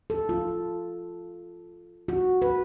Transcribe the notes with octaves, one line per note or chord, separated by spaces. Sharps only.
A4
F4
F#4
B4